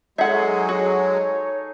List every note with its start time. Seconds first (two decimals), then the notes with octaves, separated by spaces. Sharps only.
0.18 F#3 G#3 D#4 G#4 A4 E5 F#5
0.69 F#4 C#5